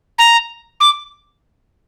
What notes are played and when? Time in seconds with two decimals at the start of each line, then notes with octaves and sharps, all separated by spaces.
0.19 A#5
0.80 D6